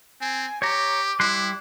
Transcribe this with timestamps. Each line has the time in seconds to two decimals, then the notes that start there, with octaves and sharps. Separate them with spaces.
0.21 C4 G#5
0.62 G4 C#5 A#5 D6
1.20 G3 E4 C6 F#6